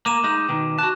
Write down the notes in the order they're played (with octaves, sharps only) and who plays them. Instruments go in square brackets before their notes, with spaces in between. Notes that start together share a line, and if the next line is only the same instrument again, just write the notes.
[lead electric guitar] A#3 [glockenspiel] D6 D#7 E7
[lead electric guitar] G#3 D#4
B2 D#3
[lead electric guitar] F#4 A5 [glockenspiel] F#6